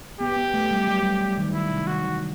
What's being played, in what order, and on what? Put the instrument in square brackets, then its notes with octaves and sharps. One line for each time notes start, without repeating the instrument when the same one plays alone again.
[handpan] B3 [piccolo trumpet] G4
[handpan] B3
A3
G3
F#3
G3
F#3
D#3
[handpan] D#3 [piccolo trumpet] E4
[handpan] C3
[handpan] D#3 [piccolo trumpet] F#4
[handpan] E3